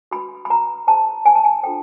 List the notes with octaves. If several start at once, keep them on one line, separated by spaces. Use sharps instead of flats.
F#4 B4 B5
B5
F#4 B4 A#5
E4 G#4 C5 A5
E4 G#4 C5 G#5
A5
G#5
D4 F4 A4 C5 G5